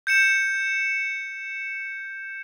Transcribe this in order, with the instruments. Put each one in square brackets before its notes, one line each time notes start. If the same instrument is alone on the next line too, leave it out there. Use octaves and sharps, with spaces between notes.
[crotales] G6 C#7 E7